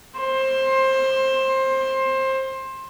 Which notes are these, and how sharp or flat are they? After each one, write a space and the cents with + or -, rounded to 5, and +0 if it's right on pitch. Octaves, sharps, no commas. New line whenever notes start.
C5 +20